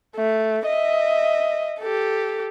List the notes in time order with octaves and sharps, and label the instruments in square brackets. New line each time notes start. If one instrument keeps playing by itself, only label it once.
[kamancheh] A3
D#5 E5
G4 A4